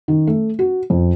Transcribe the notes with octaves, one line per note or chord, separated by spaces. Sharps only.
D#3
A3
F#4
F2